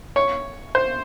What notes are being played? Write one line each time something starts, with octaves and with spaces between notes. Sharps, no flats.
C#5
C5